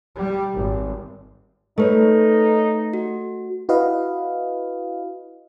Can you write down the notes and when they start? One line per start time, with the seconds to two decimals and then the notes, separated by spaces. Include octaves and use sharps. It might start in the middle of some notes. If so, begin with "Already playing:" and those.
0.15 G3
0.53 G#1
1.78 A3 D#4 A4 B4 C#5
2.94 F#4
3.69 E4 F#4 B4 D#5 F5